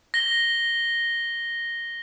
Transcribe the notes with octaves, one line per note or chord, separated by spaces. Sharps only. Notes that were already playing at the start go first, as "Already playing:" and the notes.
A#6 G7